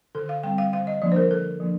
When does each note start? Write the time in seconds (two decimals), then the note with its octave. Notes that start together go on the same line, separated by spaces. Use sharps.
0.15 D3 A4
0.29 F5
0.43 G3 C4 G5
0.58 F5
0.73 D3 F5
0.87 D#5
1.02 F3 A#3 D4 D5
1.12 C5
1.16 A#4
1.31 D3 A4
1.60 F3 A#3 D4